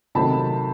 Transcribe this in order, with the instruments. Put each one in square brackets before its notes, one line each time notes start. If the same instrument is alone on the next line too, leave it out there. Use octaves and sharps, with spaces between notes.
[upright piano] C3 D#3 F#3 A3 C4 A5 B5